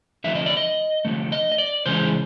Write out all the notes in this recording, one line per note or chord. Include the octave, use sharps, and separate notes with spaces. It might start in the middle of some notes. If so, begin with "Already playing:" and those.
D3 F3 A3 E5
D#5
D5
D#5
D3 F3 A3
D#5
D#5
D5
C#3 E3 G#3 C#4 C5